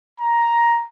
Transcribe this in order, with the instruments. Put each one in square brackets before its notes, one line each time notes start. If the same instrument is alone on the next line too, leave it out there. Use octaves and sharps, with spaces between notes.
[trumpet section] A#5